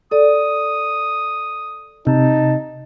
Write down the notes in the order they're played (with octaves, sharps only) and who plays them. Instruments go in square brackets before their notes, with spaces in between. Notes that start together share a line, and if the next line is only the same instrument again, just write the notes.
[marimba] A4 D5 [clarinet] D#6
[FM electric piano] C3 [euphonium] D#4 [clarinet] A5